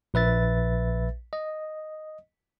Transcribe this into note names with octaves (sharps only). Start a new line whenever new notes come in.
A#1 B4 E5 A6
D#5